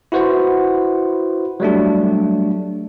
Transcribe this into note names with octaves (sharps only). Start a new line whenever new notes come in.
E4 F#4 B4 C5 F#5
F#3 G3 A3 D4